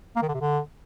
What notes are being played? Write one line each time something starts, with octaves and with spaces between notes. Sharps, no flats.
A#3
D#3
D3
C3
D3